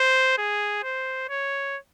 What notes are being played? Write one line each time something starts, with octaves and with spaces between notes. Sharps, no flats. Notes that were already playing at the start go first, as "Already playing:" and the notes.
Already playing: C5
G#4
C5
C#5